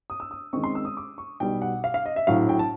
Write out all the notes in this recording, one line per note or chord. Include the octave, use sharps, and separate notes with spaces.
D#6
E6
D#6
F#2 D#3 G#3 C4 C#6
C6
E6
D#6
D6
C#6
B1 B2 G3 G5
F#5
F5
F5
D#5
E5
A#1 A2 F#3 F5
G5
A5